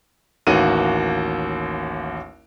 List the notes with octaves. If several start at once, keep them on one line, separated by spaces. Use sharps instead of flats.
A1 D#2 A#3 F#4 D#7